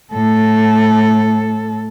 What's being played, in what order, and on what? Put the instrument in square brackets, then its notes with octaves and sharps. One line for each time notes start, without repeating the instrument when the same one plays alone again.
[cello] A2 A4